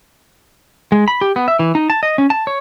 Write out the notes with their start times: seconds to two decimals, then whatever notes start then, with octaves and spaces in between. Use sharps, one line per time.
0.92 G#3
1.08 B5
1.21 G4
1.36 B3
1.48 E5
1.59 E3
1.75 D#4
1.90 A5
2.03 D#5
2.18 C#4
2.30 A5
2.47 C#5